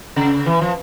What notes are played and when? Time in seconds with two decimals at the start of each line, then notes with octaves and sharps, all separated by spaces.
0.16 C#3
0.46 E3
0.61 F3